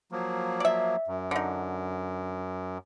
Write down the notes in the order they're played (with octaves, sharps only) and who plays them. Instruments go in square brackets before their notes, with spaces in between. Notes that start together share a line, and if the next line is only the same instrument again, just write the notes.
[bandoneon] F3 F#3 A#3
[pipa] D5 E5
[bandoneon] F#2
[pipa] D3 D#4